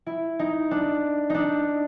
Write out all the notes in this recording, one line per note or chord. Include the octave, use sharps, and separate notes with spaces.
E4
D#4
D4
D4 D#4